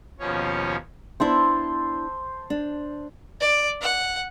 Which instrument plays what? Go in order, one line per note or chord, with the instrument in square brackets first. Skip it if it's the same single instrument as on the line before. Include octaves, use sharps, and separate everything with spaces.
[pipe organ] D#2 B2 F3 C#4 C#5
[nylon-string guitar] B3 D4 E4 [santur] C5 A5 E6
[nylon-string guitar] D4
[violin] D5
F#5